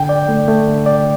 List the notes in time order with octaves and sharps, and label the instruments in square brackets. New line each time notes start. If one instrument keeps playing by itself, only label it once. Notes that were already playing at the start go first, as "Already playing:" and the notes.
Already playing: [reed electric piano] D3 [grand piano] G5
[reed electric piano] D5
A3
A3
D3
D5